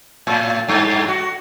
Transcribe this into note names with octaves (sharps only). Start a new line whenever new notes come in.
A2
G2
F#4